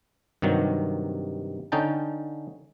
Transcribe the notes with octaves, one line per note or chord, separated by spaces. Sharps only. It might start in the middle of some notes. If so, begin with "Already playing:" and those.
G2 C3 D#3 F#3
D3 C#4 D#4 G5 A5